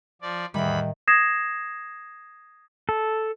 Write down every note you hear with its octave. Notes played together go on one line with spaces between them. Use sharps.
F3 D5
E2 A2 D#3 G3 E5 G5 B5
D#6 G#6 A#6 C7 E7
A4